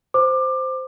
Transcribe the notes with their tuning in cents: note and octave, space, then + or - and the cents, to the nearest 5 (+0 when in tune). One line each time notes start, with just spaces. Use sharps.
C5 -10 D6 +20